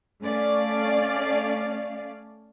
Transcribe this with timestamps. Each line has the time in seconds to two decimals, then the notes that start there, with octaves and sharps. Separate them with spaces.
0.21 A3 C#4 D5 F5